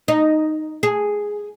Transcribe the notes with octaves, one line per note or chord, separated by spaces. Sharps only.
D#4
G#4